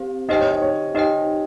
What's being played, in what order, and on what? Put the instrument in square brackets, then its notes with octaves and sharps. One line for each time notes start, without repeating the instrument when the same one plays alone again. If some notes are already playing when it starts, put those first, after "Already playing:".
Already playing: [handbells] C4 G4 C5 F5
[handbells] D#4 G4 C5 G5 [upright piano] D#5
[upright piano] C#5
D#5
C#5
[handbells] D#4 G4 C5 G5 [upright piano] D#5